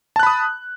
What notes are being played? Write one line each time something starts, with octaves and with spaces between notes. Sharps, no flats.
A5 B5 D#6 F#6